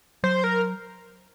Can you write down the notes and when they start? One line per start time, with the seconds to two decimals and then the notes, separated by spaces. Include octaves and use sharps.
0.23 F#3 C5
0.44 A#4